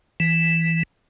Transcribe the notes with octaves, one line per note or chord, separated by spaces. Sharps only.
E3